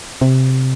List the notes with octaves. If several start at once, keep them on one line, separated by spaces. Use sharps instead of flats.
C3